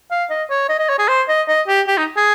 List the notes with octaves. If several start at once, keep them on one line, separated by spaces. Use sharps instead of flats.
F5
D#5
C#5
D#5
D#5
C#5
G#4
C5
D#5
D#5
G4
G4
D#4
G#4